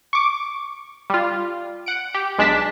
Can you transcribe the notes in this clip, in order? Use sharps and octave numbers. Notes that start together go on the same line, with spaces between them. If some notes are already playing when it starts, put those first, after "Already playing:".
C#6 D6
G3 F4
F#5 D7
G4
B1 G#3 D4 A5 B6